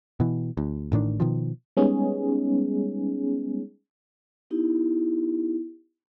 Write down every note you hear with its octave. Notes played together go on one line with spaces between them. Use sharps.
B2 E3
D2
A1 A2 D#3 D4
B2 D#3 F3
G3 G#3 B3 C#4 D#4 G#4
B3 D#4 E4 G4